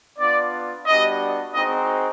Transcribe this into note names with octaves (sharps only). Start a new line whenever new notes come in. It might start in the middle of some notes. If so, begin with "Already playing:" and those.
B3 D4 F4 D5
G3 B3 D4 F#4 D#5
G#3 C4 D#4 F#4 D#5